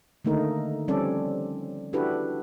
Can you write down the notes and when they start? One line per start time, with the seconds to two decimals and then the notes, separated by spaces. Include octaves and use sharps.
0.25 D3 D#3 A3 A#3 D#4 A#4
0.88 F3 G3 C4 C#4 A4 D5
1.93 D4 E4 F#4 G4 A4 B4